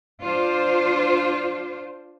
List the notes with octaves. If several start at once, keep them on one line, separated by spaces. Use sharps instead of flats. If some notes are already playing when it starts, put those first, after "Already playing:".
D4 F4 C5